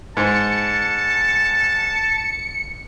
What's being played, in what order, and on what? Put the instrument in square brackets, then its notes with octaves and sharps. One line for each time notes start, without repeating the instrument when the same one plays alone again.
[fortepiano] G#2 [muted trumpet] A5 [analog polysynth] C#7